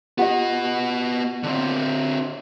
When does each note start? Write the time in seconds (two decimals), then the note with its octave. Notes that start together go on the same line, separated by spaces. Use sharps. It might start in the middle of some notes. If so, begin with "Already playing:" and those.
0.18 B3 F4 G4 D#5 F#5
1.43 D3 C4